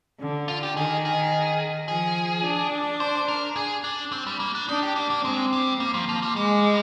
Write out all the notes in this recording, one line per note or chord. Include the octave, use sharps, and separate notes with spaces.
D3
F4
G4
D#3 G#4
G#4
F3 G#4
D4
C5
A#4
G#4
D4
C4
G3
A#3
D4
D4 D#4
G4
A#3
A#3
G#3 C4
G3
G3 A#3
F3
F3
G3
G3 G#3